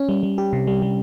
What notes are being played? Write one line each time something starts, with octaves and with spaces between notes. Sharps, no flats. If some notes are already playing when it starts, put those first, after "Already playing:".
Already playing: C#4
G3
G3
G4
C3
G3
G3